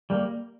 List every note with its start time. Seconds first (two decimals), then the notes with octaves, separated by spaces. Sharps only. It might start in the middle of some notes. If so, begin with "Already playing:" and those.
0.10 G3 A#3